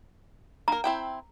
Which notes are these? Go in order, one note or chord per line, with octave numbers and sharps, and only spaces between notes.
A#3 A#4 A#5
C4 E4 G5